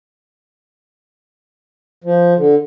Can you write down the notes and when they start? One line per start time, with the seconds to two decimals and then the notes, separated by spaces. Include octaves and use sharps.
2.04 F3
2.37 D3